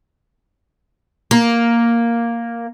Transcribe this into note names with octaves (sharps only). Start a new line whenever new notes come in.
A#3